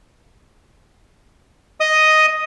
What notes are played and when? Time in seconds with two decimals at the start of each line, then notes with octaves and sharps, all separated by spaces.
1.80 D#5 D#6